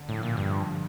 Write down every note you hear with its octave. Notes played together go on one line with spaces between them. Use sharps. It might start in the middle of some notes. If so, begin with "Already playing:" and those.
Already playing: D3
A2 F3
A#2
G2